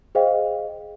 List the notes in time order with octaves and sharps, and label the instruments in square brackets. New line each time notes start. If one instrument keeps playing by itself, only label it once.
[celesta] G#4 C5 D#5 F5 G5